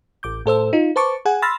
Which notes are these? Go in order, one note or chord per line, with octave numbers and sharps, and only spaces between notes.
A1 D6 G6
A2 A4 C5 E6
D#4 F4
B4 C5 A5 C#6 D6
G#4 F#5 G#5
B5 C6 E6 F6 A6 A#6